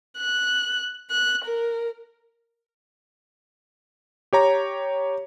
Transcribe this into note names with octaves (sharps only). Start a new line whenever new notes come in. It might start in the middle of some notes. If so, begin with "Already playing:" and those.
F#6
F#6
A#4
G4 C#5 A#5